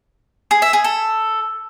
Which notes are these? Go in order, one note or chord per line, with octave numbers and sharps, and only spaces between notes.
G#4
E5
G#4
A4